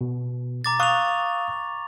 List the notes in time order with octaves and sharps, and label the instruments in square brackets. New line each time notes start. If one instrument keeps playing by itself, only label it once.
[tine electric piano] B2
[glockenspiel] A#5 D6 A6
[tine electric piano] F5 D#6 F#6 [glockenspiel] C#6 F7